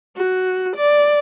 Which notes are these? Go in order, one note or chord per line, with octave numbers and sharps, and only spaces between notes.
F#4
D5